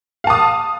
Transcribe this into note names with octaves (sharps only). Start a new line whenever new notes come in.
F5 A5 D#6